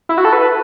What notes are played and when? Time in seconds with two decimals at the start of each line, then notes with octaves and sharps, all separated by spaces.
0.09 E4
0.18 F#4
0.25 A4
0.33 B4